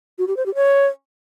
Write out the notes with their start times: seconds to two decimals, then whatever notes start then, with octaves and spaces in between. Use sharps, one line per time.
0.19 F#4
0.28 G4
0.37 C5
0.46 G4
0.55 C#5